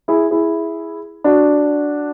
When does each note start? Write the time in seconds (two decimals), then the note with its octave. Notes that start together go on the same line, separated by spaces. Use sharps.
0.08 E4 G#4
0.31 E4 G#4
1.24 D4 F#4